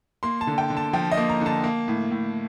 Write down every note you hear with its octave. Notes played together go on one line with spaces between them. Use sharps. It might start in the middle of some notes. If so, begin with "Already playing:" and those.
A#3 C6
A5
D3
G5
D3
A5
F3 G5
D#5
A#3
A#5
D3 A5
A#3
A2
A2